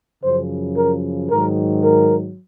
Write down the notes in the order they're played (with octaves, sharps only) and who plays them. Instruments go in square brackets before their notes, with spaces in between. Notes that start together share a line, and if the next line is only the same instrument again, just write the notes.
[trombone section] F#2 C#3 F3 C5
A#4
G#2 D#3 F#3 A#4
A#4